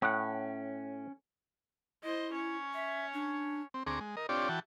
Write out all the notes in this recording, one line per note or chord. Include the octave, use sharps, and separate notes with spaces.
A2 C#4 F#5 G5 F#6
E4 C5 D#5
C#4 C#5
E5
D4
C4
D2 C4 G#4 A#5 C#6 D6
G#3
A#4 D#5
C4 D4 F4 G4 C#5 D5
E3 F#4 G5 A5